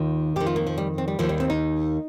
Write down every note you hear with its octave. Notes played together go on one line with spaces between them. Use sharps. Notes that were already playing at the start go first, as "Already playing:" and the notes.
Already playing: D#2 D#3 F4
F2 D#3 G4
F4
A#3
F3
G3
C4
G3
D#2 D#3 F3
G3
C4
D#4